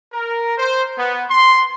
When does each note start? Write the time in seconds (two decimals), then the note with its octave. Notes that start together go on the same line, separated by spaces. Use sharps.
0.13 A#4
0.58 C5
0.98 B3
1.30 C6